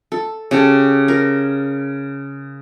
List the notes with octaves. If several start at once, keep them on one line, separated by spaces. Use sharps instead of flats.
A4
C#3 G4 A4
A#4